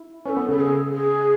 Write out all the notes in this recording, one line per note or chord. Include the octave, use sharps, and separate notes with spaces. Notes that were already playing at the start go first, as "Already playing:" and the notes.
Already playing: E4
C#4 A4 B4
B3
C#3 A4
G#4
G#4